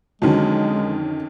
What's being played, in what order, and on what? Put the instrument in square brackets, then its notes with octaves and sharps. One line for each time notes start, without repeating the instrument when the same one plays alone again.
[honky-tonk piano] F2 D#3 C#4 [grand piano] D3 F#3 [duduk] G#3